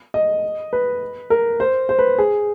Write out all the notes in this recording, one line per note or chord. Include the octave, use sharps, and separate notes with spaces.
D#5
B4
A#4
C5
C5
B4
G#4